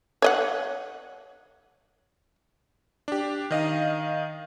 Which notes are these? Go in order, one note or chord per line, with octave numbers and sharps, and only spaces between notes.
C#5 D#5 F#5
D4 G4
D#3 D#5 F5